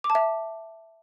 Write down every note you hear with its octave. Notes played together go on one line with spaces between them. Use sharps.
D6
A5
E5